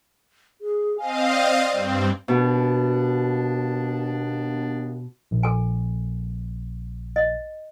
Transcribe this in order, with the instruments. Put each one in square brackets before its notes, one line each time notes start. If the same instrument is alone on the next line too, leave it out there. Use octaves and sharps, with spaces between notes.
[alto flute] G#4
[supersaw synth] C4 D#5 F5 [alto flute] G#5
[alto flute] D5
[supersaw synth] G2 C4
[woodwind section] D#2 B3 D4 [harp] B2
[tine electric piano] A#1
[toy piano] A4 G#5
D#5